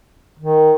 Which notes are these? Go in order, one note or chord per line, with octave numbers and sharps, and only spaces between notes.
D#3